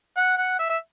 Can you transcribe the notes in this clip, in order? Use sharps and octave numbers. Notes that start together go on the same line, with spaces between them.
F#5
F#5
E5
E5